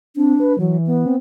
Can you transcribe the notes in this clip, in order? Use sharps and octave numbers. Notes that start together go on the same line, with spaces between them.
C4 D4
B4
E3 F#3
B3
C4